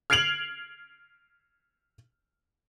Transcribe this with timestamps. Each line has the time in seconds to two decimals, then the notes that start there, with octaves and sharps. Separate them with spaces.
0.10 F6 G#6 C7 D7 F7 F#7